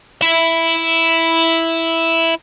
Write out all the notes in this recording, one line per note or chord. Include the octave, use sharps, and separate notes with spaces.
E4 E5